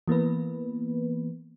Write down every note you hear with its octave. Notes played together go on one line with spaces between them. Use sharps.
E3 A#3 B3 B4